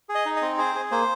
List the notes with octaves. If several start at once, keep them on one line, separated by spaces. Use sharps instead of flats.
G#4
D#5
D#4
D#5
C4
G#4 C5
G#4
A#3 C5